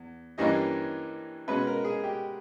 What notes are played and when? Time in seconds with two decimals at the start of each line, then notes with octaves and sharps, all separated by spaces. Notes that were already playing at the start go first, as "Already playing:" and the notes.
Already playing: E2
0.38 G2 E3 G3 A#3 C#4 D#5
1.48 B2 G#3 C#4 B4
1.67 A#4
1.85 G#4
2.04 G4